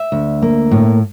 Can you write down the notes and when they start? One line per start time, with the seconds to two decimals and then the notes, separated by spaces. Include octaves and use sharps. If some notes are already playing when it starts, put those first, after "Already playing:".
Already playing: E5
0.12 D2
0.42 A#3
0.71 A2